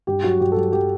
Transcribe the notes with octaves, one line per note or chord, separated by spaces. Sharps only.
G2 G4
F#3 F#4
G2 G4
A4
F#3 G4
F#3 G4